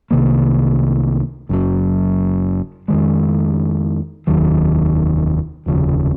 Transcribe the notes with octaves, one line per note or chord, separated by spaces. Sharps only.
C2 C3 D#3 A#3
F#1 F#2 C#3 F#3
F2 D#3 G#3
F1 D#2 D#3 F#3
F1 D#2 C#3 F3